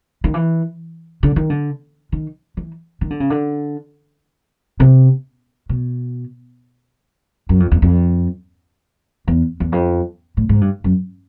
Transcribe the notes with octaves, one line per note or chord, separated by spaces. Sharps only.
D#3
E3
D3
D#3
D3
D#3
E3
D#3
D3
C#3
D3
C3
B2
F#2
F2
E2
F2
E2
E2
F2
A2
G#2
G2
F#2